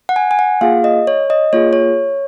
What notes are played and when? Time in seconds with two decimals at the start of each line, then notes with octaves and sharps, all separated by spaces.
0.09 F#5
0.16 G#5
0.31 G#5
0.39 F#5
0.61 A#3 F4 G#4 F5
0.84 D#5
1.07 C#5
1.30 D#5
1.53 A#3 F4 G#4 C#5
1.73 C#5